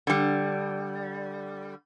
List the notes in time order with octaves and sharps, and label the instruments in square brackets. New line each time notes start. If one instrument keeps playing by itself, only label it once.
[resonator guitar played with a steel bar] D3 G3